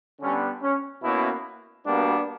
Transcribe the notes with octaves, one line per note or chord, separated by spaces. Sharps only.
D3 G3 B3 C#4
C#4
B2 A#3 C#4 E4
B2 G3 A#3 B3 D4